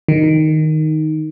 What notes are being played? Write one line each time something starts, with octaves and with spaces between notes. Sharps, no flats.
D#3